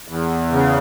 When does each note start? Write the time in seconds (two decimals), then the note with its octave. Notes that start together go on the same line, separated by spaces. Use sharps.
0.08 E2
0.52 C#3